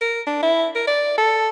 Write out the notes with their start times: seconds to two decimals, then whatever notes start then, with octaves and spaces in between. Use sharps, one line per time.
0.01 A#4
0.27 D4
0.42 E4
0.75 A#4
0.87 D5
1.18 A4